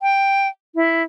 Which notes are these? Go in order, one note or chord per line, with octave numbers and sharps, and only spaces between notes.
G5
E4